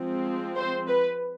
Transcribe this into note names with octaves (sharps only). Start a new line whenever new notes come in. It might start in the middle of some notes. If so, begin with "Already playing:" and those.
Already playing: F3 G#3 C4
C5
B4